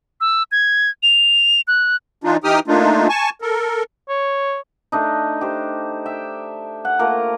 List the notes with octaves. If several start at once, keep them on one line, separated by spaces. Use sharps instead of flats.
E6
G#6
F7
F#6
E3 D4 D#4 F4
E3 D#4 G4 G5 D#6 F6
A3 A#3 D4 D#4 F4
G#5 A5 C#6
A4 A#4
C#5
A3 D4 D#4
G4 C5
E5 G5
F#5
A3 A#3 F4 A#4